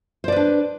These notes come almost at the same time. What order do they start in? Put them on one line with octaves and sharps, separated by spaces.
C5 D5 B4 D4